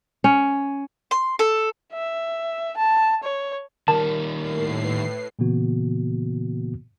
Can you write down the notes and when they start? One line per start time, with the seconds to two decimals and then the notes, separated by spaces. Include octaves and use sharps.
0.24 C#4
1.11 C6
1.39 A4
1.93 E5
2.77 A5
3.24 C#5
3.88 D#3 G3 A#4 A5
4.36 A2 C7
4.84 B4
5.39 A#2 C#3 E3 A#3 B3 F#4